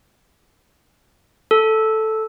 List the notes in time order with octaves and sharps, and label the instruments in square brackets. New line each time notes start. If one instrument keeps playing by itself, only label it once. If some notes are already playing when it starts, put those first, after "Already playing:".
[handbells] A4